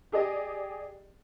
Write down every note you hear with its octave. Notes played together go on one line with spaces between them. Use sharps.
G4 G#4 D5 D#5